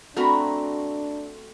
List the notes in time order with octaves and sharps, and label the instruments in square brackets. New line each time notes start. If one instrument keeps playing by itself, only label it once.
[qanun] A3 C4 F#4 [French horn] D4 [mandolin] A#4 A#5 B5